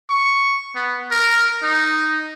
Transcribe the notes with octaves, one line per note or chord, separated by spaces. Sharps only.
C#6
B3
A#4
D#4